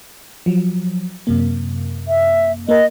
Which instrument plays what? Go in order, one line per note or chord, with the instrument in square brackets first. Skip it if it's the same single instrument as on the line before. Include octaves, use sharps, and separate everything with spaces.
[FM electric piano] F3 F#3
F#2 C3 A#3
[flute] E5
[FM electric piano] A#3 A#4 [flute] D#5